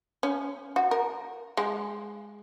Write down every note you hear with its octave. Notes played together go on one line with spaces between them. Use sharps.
C#4
F#4
A#4
G#3